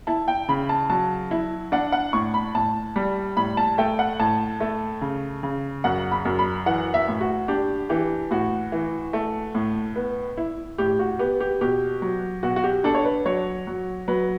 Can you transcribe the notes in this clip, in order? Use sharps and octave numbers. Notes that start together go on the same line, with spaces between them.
E4 A5
G5
C#3 B5
A5
F#3 A5
E4
D4 F#5
F#5
A2 C#6
B5
A2 A5
G3
A2 B5
A5
A3 G5
F#5
A2 A5
A3
C#3
C#3
F#2 F#5
B5
F#2
B5
E3 F#5
E5
A2
F#4
D4 G4
E3 G4
A2 F#4
E3
A3
A2
B3
E4
A2 G4
F#4
B3 G4
G4
B2 G4
F#3
B2 F#4
F#4
G4
D4 A4
C#5
B4
F#3 C#5
F#3
F#3 B4